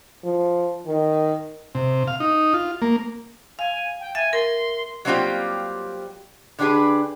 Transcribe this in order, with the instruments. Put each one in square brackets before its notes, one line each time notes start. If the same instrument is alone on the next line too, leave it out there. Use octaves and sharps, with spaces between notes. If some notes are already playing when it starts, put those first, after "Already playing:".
[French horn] F3
D#3
[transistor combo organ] C3
F5
D#4
F4
A#3
[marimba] F5 [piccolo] G#5
[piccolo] G5
[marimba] E5 A6 [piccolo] G#5
[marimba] A#4 [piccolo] C6
[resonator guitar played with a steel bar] F#3 G3 A#3 C4 F4 G4
D3 D4 G4 G#4 B4